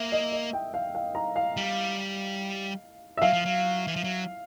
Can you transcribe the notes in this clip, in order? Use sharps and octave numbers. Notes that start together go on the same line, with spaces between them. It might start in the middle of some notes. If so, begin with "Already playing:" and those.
Already playing: A#3 E5
D#5
D#5
G5
F5
F5
A#5
F5
G3
E5
F#3 F5
F3
F#3
E3
F3
F#3